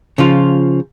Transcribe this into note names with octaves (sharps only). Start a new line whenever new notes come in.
C#3 F3 F4